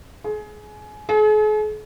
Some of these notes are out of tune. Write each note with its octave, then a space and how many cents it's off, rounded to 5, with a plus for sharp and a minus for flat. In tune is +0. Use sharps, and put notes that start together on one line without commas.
G#4 +25
G#4 +45